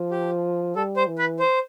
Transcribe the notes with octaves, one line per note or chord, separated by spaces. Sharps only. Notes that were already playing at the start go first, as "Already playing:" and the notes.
Already playing: F3
G4
G3 A4
C5
E3
B4
C5